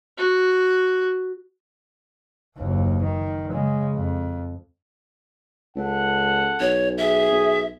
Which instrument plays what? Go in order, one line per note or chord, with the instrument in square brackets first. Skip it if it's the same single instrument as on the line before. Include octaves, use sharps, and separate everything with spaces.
[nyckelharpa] F#4
[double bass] F#1 D#2
D#3
C#3 G#3
F2
[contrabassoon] C#2 [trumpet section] A4 F#5
[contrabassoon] B1 [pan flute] C#5
[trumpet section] G#4 [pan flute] E5
[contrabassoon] B1